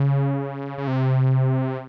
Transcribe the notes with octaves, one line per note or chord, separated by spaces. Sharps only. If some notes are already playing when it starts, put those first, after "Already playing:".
Already playing: C#3
C#3
C3